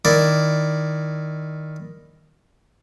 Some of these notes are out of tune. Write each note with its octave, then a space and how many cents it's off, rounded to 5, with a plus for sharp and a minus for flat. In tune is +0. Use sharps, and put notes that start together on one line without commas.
D#3 +0 E4 +0 D5 +0